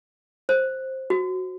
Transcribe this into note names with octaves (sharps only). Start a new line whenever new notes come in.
C5
F#4